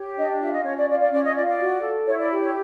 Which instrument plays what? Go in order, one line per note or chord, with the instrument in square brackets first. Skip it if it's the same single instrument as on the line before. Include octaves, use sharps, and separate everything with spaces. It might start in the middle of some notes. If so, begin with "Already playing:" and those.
Already playing: [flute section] G4 C#5
D4 D#5
F4 E5
D#5
C#4 C#5
D5
F4 D5
D5
C#4 D5
D#5
F4 D5
D5
F#4
A4
E4 C#5
D5
G4
C#5